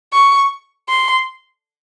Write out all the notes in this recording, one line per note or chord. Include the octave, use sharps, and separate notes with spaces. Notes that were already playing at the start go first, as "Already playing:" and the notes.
C#6
C6